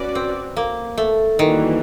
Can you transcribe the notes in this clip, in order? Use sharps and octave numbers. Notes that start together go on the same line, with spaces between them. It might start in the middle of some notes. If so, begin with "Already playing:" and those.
Already playing: C#4 F#4 B4 D5
C4
A#3
A3
D#3 E3 G3 A#3 D4 F#4